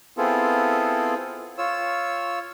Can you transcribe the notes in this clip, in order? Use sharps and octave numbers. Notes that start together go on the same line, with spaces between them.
B3 C4 E4 F4 G#4 A4
F4 C#5 E6